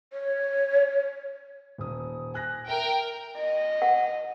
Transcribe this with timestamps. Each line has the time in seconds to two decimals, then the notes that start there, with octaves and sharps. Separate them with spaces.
0.13 C#5
1.78 D#1 D#6
2.34 G#5 F#6 A#6
2.68 A#4 E5 G5
3.37 D#5
3.82 F#5